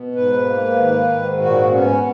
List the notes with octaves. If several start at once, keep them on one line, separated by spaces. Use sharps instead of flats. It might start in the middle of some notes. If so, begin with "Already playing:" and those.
Already playing: B2
G#2 B4
A#3
D#3
G#2
A#2 F#4
B3 C#4